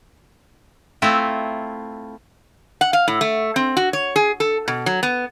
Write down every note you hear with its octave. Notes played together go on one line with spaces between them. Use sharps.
A3 C4 E4 F4
F#5
F5
A2
A3
C4
F#4
C#5
G#4
A4
B2
F#3
B3